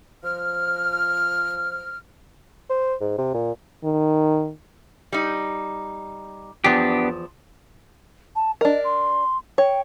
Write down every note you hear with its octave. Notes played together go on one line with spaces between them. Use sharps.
F3 F6
C5
G#2
C3
A#2
D#3
G3 D#4
E2 F3 B3 D4 G4
A5
D4 A#4 D#5
C6
C#5 G5